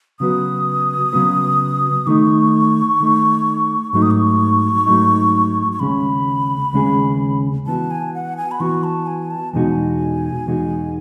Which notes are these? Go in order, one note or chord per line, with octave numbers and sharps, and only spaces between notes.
C#3 F#3 B3 F#4 B4 D#6
C#3 F#3 B3 F#4 B4
D#3 A3 D#4 C#6
D#3 A3 D#4
G#2 F#3 A3 D#4 C#6
D#6
C#6
G#2 F#3 A3 D#4
C#6
D#2 C#3 G#3 C#4 G#4 B5
D#2 C#3 G#3 C#4 G#4
E3 B3 F#4 A5
G#5
F#5
G#5
B5
E3 B3 F#4 C#6
A5
G#5
A5
E2 B2 G#3 D#4 F#4 G#5
E2 B2 G#3 D#4 F#4